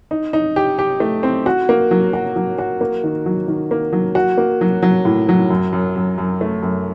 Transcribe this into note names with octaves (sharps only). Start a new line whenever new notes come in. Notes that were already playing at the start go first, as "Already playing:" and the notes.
D#4
D#4
G4
G4
A3
C4
F#4
A#3
F#3
F#4
F#3
F#4
A#3
D#3
F#3
D#3
A#3
F#3
F#4
A#3
F#3
F#3
A2
F#3
F#2
F#2
F#2
F#2
A3
F#2